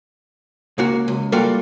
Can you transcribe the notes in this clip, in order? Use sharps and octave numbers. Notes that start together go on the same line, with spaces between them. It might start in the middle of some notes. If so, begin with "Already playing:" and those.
C#2 A#3 F#4
C#2
G3 A#3 F4 F#4 A4